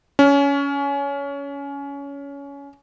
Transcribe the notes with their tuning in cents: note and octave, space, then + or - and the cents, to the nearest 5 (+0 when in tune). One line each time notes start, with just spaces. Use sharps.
C#4 +20